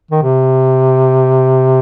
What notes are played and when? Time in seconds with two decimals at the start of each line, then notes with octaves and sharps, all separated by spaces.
0.11 D#3
0.22 C3